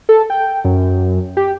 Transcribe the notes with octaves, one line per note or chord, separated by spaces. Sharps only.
A4
G5
F#2
G4